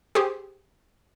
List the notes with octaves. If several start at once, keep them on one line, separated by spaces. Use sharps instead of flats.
G4 G#4 C5